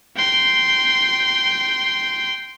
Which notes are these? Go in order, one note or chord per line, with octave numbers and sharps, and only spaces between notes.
G5 C6